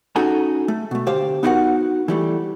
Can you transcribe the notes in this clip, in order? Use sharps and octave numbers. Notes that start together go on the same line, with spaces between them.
C#4 D#4 F#4 G#4 A4 A#5
A3
B2 A3
D2 G4 C5 F5
B3 D#4 E4 F#4 A#4 F#5
E3 G3 A3